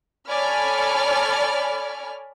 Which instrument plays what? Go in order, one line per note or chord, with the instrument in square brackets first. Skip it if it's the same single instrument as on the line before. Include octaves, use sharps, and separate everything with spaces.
[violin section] A4 C#5 D5 G#5 B5 F6